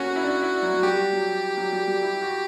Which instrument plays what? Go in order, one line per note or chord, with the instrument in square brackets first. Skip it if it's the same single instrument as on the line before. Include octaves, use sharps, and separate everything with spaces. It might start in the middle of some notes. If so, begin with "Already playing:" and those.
Already playing: [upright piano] A#3 C#4 [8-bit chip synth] F#4
[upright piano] E4
D4
E4
F#3
F#3
[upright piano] G3 [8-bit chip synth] G4
[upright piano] F#3
F#3
G3
G3
E4
F#4